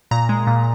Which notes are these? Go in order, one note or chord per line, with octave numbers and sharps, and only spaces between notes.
A#2 A#5
G#3
A#2